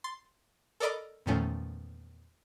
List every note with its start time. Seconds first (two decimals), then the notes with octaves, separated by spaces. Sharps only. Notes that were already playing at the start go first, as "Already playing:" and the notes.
0.04 C6 A6
0.80 A4 A#4 D5 D#5 B5 D6
1.26 E2 A#2 D#3 F3 A3 C#4